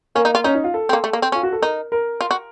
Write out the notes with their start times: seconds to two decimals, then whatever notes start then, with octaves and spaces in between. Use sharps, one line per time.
0.15 A#3 C#4
0.25 D#4
0.35 F4
0.44 C#4 D#4
0.55 D#4
0.64 F4
0.74 A4
0.89 C4
0.93 A#3
1.04 A3
1.13 A#3
1.22 C4
1.32 C#4 F4
1.43 F#4
1.53 A4
1.61 D#4 A#4
1.92 A#4
2.21 F4
2.31 F#4